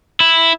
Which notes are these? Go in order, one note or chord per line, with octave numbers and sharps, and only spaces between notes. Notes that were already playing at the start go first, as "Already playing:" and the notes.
E4